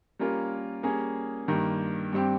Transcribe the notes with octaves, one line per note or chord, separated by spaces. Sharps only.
G3 A#3 C#4 F4 A#4
G3 A#3 C#4 G#4
G2 D#3 A#3
G2 G3 C4 G4